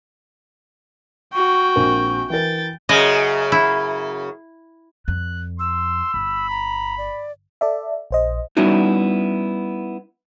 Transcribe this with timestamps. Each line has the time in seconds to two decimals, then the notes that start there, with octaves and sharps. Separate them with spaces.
1.33 F#4 G5 C#6
1.76 A#1 C4 A#4
2.30 E3 A#4 G5 A6
2.89 F#2 C#3 D#5
3.52 E4
5.08 F2 F#6
5.60 C6 E6
6.14 G1 B5
6.50 A#5
6.98 D5
7.61 A4 D5 E5
8.11 A#1 C5 D#5
8.57 G3 B3 C#4 D#4 E4 F#4